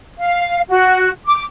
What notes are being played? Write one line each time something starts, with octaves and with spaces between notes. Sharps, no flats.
F5
F#4
D6